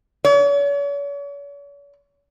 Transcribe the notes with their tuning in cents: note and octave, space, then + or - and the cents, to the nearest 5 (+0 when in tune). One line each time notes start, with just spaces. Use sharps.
C#5 +45